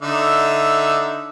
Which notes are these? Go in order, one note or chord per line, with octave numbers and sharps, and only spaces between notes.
D3 D#4 E5